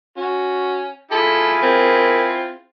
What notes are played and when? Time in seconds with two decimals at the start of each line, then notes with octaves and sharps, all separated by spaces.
0.17 C#4 F#4
1.12 E4 F4 G#4 A4
1.63 C4 A#4